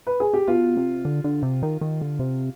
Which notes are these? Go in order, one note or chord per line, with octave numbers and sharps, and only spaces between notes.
B4
G#4
G4
B2 F4
C3
D3
D3
C3
D#3
D#3
D3
C3